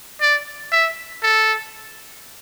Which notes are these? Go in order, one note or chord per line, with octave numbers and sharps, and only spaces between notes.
D5
E5
A4